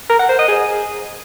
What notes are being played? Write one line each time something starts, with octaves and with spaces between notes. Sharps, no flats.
A#4
F#5
C5
D#5
G#4